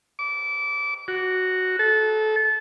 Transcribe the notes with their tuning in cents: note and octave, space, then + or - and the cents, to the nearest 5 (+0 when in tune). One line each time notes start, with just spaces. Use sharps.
D6 -25
F#4 +0
A4 -25